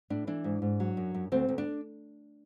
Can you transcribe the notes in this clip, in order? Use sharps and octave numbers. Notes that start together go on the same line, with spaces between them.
A2 D4
E3 D4
G#2
G#2
F#3
F#2
F#2
D2 C4
D2
D4